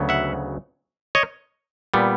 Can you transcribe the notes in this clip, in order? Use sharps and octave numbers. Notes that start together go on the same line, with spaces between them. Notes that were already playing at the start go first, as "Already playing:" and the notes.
Already playing: D2 C#3 F#3 B3
E5 F#5
C#5 D#5
A#2 G3 B3